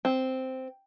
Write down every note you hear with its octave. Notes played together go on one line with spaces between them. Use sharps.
C4